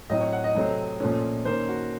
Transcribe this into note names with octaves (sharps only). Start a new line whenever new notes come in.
A2 F#3 C4 D#5
C#5
F#5
D#5
C3 F#3 A3 C4
A#2 F3 A3 C#4
D#3 A#3 C#4 C5
F#4